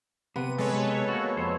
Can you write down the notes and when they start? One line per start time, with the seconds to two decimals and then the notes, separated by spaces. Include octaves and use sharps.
0.36 C3 B3 D#7
0.58 G#3 A4 B4 C#5
1.09 A#3 F#4
1.37 F2 C5